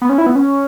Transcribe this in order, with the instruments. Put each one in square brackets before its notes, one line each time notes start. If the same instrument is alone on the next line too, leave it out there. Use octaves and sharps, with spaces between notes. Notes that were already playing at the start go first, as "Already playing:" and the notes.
[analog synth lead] B3
C#4
E4
B3
C#4